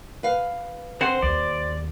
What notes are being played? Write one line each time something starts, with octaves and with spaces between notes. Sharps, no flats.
B4 F5
C4 C5 F#5
D#2 D5